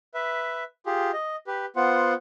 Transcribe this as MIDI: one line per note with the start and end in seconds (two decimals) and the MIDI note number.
0.14 0.64 71
0.14 0.64 76
0.86 1.11 65
0.86 1.11 67
0.86 1.11 68
1.13 1.36 75
1.47 1.66 67
1.47 1.66 71
1.76 2.14 59
1.76 2.14 65
1.76 2.14 72
1.76 2.14 78